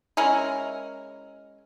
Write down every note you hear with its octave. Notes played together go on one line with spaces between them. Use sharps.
G#3 C#4 E4 A#4